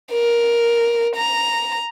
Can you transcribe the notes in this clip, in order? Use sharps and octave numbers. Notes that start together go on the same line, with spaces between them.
A#4
A#5